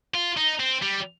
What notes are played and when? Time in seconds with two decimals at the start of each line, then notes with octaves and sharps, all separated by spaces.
0.15 F4
0.37 D#4
0.60 C4
0.83 G3